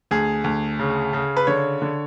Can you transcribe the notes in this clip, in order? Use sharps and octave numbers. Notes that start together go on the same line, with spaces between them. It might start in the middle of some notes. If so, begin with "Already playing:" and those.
D2 G#4
D2
C#3
C#3
B4
D3 C#5
D3